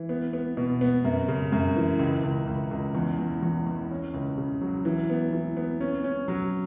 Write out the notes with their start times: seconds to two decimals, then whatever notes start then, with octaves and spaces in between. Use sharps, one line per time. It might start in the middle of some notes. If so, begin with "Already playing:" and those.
Already playing: E3
0.09 B3
0.33 B3
0.57 B2
0.81 B3
1.05 F#2
1.28 C#3
1.52 F#2
1.76 E3
1.99 C#2
2.24 C#2
2.47 C#2
2.71 C#2
2.95 E2
3.19 E2
3.43 E2
3.67 E2
3.91 C#4
4.14 C#2
4.38 C#3
4.61 F#3
4.85 E3
5.10 B3
5.33 E3
5.57 B3
5.81 C#4
6.04 C#4
6.28 F#3